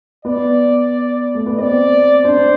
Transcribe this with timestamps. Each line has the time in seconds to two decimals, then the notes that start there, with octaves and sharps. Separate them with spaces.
0.25 B3 D5
1.34 A3
1.46 B3
1.58 C4 D5
2.24 D4 C5